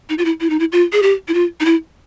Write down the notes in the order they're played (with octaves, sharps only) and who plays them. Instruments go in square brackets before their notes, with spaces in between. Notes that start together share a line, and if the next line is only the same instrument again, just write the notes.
[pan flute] D#4
F4
E4
E4
D#4
E4
F4
G#4
G4
E4
F4
D#4
E4